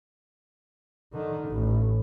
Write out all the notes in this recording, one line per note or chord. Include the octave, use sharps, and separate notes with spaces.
D3 D#3
A1